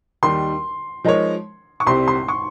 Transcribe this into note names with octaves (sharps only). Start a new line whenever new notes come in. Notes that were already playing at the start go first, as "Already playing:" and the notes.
D#2 D#3 G3 C6
F3 G#3 D#4 A#4 C#5
C#6
C2 C3 G3 C4 G4 C6
C6
C#6